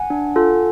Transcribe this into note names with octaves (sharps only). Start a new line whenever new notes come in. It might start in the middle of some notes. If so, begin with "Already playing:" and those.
Already playing: F#5 G#5
D4
F4 A4